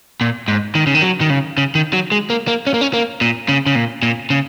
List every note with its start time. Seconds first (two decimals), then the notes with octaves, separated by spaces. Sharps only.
0.21 A#2
0.48 G#2
0.75 D#3
0.87 C#3
0.95 D#3
1.02 F#3
1.21 D#3
1.30 C#3
1.58 C#3
1.75 D#3
1.93 F#3
2.12 G#3
2.30 A#3
2.48 A#3
2.67 C#4
2.74 A#3
2.81 C#4
2.93 A#3
3.21 A#2
3.49 C#3
3.66 C#3
3.75 A#2
4.03 A#2
4.30 C#3